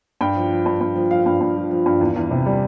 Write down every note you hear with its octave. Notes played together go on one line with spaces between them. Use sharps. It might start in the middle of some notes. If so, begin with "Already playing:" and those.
G2 G5
F3
F3
G2
G2
F3
F3 F5
G2
G2
F3
F3
G2
E2
E2
C3
G3